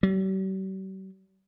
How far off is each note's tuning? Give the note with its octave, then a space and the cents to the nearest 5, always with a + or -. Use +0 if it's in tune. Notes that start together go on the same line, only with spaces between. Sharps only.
G3 -45